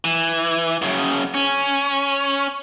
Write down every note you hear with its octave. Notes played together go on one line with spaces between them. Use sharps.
E3
F#2 C#3
C#4